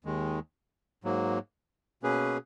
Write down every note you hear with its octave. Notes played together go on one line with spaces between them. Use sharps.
D#2 D#3 G#3
G#2 F#3 A#3
B2 A#3 C#4 G#4 B4